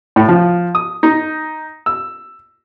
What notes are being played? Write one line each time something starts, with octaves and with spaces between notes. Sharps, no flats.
A2
F3
D#6
D#4
E6